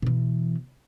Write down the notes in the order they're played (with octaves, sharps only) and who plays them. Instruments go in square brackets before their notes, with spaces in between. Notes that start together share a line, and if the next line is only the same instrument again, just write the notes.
[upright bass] B2 E3